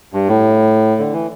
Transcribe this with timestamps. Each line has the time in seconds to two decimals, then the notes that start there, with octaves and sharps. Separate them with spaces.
0.13 G2
0.28 A2
0.98 D3
1.12 E3